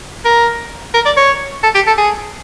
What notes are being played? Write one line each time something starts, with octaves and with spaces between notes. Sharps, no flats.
A#4
A#4
D5
C#5
A4
G4
A4
G#4